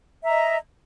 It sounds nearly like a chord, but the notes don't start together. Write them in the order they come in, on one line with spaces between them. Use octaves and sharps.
E5 A#5 D#5